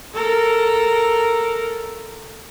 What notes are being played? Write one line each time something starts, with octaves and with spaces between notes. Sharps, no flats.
A4 A#4